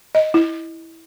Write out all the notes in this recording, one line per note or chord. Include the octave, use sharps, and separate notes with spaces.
D#5
E4